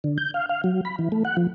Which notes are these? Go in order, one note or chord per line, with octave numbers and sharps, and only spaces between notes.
D3
G6
F5
F5
F#3
B5
E3
A3
F#5
F3